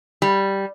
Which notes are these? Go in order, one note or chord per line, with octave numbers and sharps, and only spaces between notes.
G3